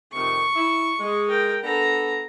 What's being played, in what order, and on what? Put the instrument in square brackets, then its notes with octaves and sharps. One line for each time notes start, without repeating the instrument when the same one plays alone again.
[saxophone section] F2 C3 D#3 [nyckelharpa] C#6
[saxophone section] E4
G#3
[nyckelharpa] A#4 G5
[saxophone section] B3 D4 A4 [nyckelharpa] A#5